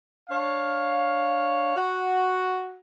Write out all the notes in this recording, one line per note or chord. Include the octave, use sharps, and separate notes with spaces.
D4 C#5 F5
F#4 F#5